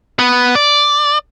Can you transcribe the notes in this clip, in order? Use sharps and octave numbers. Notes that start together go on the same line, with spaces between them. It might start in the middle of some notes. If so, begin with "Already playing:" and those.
B3
D5